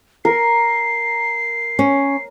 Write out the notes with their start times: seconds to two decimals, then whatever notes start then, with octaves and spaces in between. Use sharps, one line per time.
0.25 A#4 C7
1.79 C#4